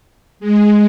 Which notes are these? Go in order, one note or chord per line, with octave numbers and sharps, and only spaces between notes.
G#3